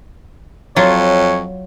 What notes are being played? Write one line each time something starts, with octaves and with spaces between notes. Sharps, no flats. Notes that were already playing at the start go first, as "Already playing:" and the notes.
F2 F#3 F4 C#5